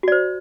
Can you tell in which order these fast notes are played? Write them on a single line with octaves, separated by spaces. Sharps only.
F#4 D5 C5